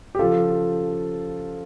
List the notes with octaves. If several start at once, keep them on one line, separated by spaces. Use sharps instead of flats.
G4
C#3 F3 F4 A4